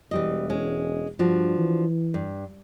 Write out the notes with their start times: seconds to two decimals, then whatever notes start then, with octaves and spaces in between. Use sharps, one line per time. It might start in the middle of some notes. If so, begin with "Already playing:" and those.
0.11 E1 E3 G3 D#5
0.49 G#3 C#4
1.19 G2 F3 D4 F#4
1.58 E3
2.14 G2